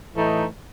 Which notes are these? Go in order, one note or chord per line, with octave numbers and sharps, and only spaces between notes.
A2 E3 A3 D#4